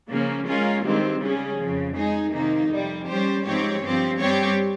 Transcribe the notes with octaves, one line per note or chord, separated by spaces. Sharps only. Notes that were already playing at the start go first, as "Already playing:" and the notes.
C#3 F3 A#3 C#4
G#3 C#4 F4 A#4
G2 D#3 G#3 C4
C#3 G3 C#4 G#4
F2 C#3 F3
G#3 D#4 G#4
C3 D#3 A#3 D#4
F2 C3 G3
G3 C#4 G4 C5
G#2 F3 C4 G4 C#5
G2 F3 C4 G4
G2 G3 C4 G4 C#5